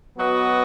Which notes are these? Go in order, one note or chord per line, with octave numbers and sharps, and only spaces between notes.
F#3 B3 F#4 B4 D#5